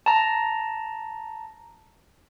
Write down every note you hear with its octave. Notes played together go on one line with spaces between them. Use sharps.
A5 A#5